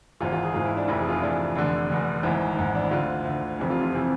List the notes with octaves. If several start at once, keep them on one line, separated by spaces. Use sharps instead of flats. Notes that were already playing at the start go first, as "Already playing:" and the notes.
G#1 G#2 E3 F4
F4
G#4
G#1 G#2 E3 F4
E4
D4
F1 F2 E3 E4
G#4
F4
E4
F1 F2 E3 D4
F1 E2 D3 D4
F1 E2 D3
G#1 G#2 E3 E4
G#1 G#2 E3
D4
E4
D2 D3 F4
D2 D3
F1 F2 C3 E3
F4
F4
C3 E3 C4